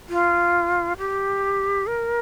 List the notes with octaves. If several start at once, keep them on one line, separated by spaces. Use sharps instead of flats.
F4
G4
A#4